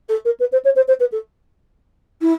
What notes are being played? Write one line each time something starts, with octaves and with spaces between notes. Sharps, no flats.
A4
A#4
B4
C5
C#5
C5
C5
B4
A4
E4